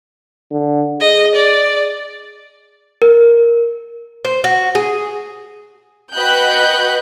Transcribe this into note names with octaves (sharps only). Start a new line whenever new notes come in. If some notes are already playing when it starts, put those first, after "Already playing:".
D3
G#4 D#5
D5
A#4
C5
F#4
G#4
F#4 B4 D#5 G5 F#6 G6